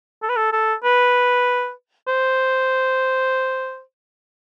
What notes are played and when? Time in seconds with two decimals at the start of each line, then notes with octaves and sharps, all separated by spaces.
0.23 A4
0.29 B4
0.37 A4
0.53 A4
0.84 B4
2.08 C5